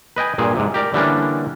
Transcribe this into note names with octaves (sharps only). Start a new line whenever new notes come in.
B4 D#5 G5 G#5
G2 A#2 G#4
G#2 C3
G4 A#4 D5
D3 E3 G3 A#3 C#4 D4